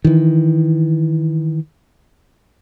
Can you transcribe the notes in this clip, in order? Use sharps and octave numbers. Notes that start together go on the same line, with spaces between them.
D#3 E3